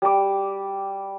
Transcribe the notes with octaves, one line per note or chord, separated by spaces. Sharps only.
G3 D6